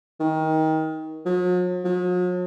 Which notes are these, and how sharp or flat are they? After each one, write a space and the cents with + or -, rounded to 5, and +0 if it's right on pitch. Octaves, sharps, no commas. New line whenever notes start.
D#3 +25
F#3 -45
F#3 -45